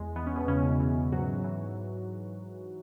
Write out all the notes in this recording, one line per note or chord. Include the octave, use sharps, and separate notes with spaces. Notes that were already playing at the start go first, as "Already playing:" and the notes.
Already playing: E2 G#3
E3 B3
C#4
B2 B3
E2 C#3 C#4
E3
G#2 F#3 F#4
E3